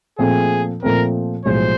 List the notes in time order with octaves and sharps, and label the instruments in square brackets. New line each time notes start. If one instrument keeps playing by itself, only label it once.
[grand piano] A#2 F3 A3 C4 [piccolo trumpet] G#4
[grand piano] A#2 F3 A3 C4 [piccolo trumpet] A#4
[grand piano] B1 A2 F3 G#3 [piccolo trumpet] C5